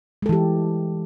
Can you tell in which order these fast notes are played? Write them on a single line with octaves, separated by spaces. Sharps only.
G#3 A4 E3 G4